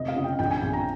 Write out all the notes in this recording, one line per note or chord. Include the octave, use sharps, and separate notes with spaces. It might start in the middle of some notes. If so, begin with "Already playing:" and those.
Already playing: F1 D#5
F5
C#3
G5
A#1 G5
G#5
A#1 G#5
A#5